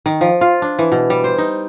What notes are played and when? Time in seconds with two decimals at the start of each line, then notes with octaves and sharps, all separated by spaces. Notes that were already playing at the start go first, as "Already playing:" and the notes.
0.06 D#3
0.21 F3
0.41 F4
0.62 D4
0.79 E3
0.92 B2
1.10 G3
1.24 C5
1.38 D#4